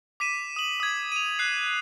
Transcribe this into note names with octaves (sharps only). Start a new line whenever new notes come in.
D6 B6 D#7 E7
D#6 F#7
D#6 G#6
D#7 F7
F#6 C7